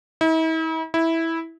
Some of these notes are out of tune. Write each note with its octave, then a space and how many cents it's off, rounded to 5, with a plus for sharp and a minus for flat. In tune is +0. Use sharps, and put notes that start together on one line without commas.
E4 -45
E4 -10